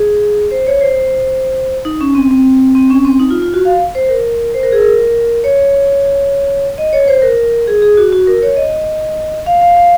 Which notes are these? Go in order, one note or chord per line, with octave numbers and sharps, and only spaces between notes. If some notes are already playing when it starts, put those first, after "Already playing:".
Already playing: G#4
C5
C#5
C5
D#4
C#4
C4
C4
C4
C#4
C4
D#4
F4
F4
F#4
F5
C5
A#4
C5
A#4
G#4
A#4
C#5
D#5
C#5
C5
A#4
G#4
G#4
F#4
F#4
A#4
C#5
D#5
F5
F5
F5